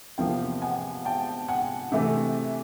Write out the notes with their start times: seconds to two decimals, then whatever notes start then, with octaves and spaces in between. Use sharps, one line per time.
0.18 E2 C3 F3 A#3 F5 G5
0.62 F#5 G#5
1.05 G5 A5
1.49 F#5 G#5
1.92 C3 E3 A3